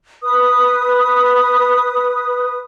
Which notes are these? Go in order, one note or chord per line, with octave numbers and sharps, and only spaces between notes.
B4 D#6